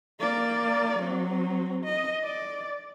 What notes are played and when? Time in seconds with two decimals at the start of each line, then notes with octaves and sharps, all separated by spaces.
0.20 A#3 D5
0.99 F#3 C4
1.84 D#5
2.24 D5